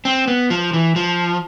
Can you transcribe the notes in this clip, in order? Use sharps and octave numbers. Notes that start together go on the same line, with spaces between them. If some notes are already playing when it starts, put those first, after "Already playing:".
C4
B3
F3
E3
F3